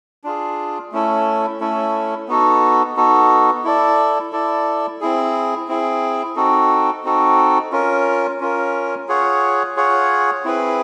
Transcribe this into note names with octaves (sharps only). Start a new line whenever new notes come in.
D4 F4 G#4
A3 C#4 E4 A4
A3 C#4 E4 A4
B3 D#4 F#4 A4
B3 D#4 F#4 A4
E4 A4 D5
E4 A4 D5
C4 E4 G#4
C4 E4 G#4
C4 D#4 F#4 A4
C4 D#4 F#4 A4
C#4 F4 A#4
C#4 F4 A#4
F4 G#4 C#5 F#5
F4 G#4 C#5 F#5
C4 E4 G#4 B4